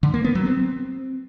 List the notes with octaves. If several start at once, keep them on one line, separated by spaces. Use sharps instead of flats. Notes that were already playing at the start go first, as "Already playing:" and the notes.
D3
A#3
B3
F#3
C4